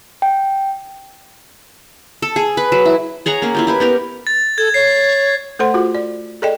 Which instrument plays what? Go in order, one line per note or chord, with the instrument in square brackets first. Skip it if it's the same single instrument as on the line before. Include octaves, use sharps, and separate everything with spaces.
[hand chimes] G5
[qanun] A4
G#4
B4
F#3
E4
G#4 C#5 F#5 A#5
A#3 C#4
E4 F4 G4
E4 G4 B4
B3 G4 A#4
[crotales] A6
[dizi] A4 [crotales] G#6
[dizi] C#5 [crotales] C7
[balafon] A3 A4 C5 F#5 C6
F4 F#4 G#4
D5
G#4 A4 D5 D#5 G5